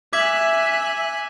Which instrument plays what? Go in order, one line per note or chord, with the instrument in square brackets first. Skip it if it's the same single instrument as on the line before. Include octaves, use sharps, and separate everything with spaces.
[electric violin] E5 [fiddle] G#5 F#6 [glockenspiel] D6 G#6 B6